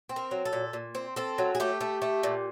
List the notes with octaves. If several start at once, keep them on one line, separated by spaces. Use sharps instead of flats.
C4
A#4
F#3
A4
A#2
A#2
C4
C4 A4
F#3
G#4
A3 G4
A3
A3
A#2